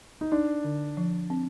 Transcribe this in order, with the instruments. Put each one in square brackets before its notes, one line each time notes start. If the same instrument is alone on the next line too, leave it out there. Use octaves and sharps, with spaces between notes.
[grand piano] D#4
[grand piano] D4 [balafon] D#4
[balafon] D3
F3
C4